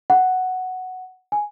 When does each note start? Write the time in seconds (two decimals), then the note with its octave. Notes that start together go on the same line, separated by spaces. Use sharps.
0.10 F#5
1.32 G#5